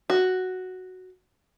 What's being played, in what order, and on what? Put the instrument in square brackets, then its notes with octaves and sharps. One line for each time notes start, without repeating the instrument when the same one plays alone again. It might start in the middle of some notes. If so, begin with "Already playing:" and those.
[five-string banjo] F#4